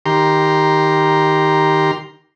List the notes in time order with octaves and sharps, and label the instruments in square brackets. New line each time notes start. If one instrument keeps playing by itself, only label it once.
[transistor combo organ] D#3 G4 A#5 C6